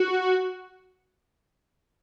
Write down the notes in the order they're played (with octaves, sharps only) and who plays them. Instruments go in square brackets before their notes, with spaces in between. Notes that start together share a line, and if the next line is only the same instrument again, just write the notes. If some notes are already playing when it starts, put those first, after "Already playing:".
Already playing: [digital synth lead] F#4